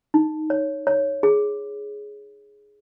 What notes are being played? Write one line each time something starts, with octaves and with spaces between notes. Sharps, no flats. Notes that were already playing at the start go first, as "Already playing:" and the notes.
D#4
C#5
C#5
G#4